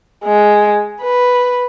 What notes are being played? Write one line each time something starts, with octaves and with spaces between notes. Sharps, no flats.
G#3
B4